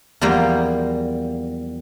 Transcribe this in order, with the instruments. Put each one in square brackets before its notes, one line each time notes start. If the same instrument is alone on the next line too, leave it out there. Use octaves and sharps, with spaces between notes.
[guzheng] E2 F3 G3 A#3 G5